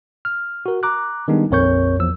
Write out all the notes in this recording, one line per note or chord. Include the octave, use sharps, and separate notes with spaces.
F6
F#4 A#4
A#5 D6 F#6
D#3 G3 G#3 B3 D4 D#4
A#1 F2 A#4 C#5 C#6 G6
E2 F3 E6